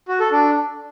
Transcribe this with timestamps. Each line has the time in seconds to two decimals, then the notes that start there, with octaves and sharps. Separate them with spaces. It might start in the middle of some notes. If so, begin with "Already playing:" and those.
0.08 F#4
0.20 A4
0.32 D4